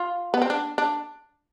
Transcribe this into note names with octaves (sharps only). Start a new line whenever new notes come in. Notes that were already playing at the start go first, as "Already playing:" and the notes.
Already playing: F4
B3
C4
D4
D4